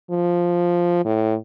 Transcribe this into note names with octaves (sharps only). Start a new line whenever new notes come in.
F3
A2